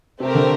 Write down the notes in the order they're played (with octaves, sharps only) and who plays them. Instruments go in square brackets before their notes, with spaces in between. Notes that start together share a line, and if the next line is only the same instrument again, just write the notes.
[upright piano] C3 [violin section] A3 C4 G4 A#4
[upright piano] D3